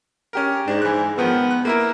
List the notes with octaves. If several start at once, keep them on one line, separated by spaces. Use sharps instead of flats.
C#4 G4 A#4
G#2 D4
E3 F#6
D#3 F3 B3
F#6
A#3 E4 A#4